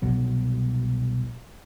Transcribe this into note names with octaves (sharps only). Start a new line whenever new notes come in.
C2 B2 F#3